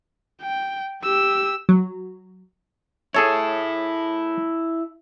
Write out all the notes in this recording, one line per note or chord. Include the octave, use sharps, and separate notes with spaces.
G5
G4 E6
F#3
E4 G#4 A4 C#5 A5